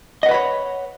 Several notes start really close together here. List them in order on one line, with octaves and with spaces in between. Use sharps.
D#5 F#5 B4 B5 C#5